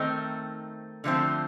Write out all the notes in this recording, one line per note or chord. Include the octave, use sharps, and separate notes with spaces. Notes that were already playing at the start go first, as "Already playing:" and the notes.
Already playing: D#3 A3 C4 D#4
D3 F3 A3 C4